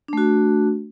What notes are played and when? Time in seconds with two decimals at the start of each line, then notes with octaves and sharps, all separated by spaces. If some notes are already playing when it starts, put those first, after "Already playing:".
0.08 D4
0.13 A3
0.18 F#4